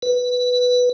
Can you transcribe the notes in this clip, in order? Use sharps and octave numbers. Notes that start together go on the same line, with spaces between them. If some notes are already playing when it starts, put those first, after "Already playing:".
B4